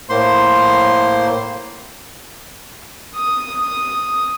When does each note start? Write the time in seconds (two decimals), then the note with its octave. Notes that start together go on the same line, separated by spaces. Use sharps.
0.09 A2 A#3 C5 C6
3.16 D#6